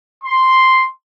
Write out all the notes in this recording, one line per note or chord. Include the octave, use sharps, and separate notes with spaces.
C6